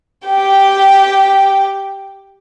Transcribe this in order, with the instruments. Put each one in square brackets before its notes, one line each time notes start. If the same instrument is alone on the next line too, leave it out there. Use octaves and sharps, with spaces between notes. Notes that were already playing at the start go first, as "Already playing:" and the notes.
[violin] G4 G5